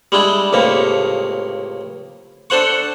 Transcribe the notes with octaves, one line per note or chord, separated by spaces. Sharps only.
G3 G#3 D4 E4
C#2 A2 C3 A#3
D4 A4 C5 F#5 C#6